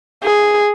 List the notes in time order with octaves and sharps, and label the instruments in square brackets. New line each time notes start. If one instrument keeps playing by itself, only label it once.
[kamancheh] G#4